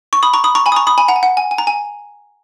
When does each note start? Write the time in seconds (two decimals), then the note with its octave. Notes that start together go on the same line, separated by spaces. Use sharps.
0.13 C#6
0.23 B5 D#6
0.34 A#5 C#6
0.44 B5 D#6
0.55 A#5 C#6
0.66 G#5 B5
0.72 D#6
0.76 A#5 C#6
0.87 B5 D#6
0.98 G#5 B5
1.08 F#5 A#5
1.16 G#5
1.23 F#5
1.37 G#5
1.51 G#5
1.58 A#5
1.67 G#5